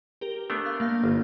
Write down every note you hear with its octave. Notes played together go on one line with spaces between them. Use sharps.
G4 A#4 G7
A3 B3 D4
F5
A#3 F5 G6
G1